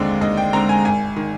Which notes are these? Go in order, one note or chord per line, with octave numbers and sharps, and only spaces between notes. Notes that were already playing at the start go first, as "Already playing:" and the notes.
Already playing: D#2 D3 G#3 C4 D5
D#2 D#5
G5
D3 G#3 C4 A#5
G#5
G#1 G#5
D#3